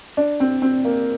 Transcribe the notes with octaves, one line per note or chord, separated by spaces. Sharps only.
D4
C4
C4
A#3